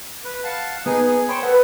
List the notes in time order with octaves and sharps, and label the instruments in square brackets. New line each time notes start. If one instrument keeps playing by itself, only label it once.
[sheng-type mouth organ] B4
F5 F#5 A5
[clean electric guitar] B3 B4 [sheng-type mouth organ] D#4 G#4
[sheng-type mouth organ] G#4
[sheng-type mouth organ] C5 C#5 G5 [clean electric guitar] B5
[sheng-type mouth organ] A4 [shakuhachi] B4 [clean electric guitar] F#5